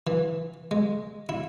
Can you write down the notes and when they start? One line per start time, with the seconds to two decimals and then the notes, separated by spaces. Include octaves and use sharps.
0.07 E3
0.71 G#3
1.29 E4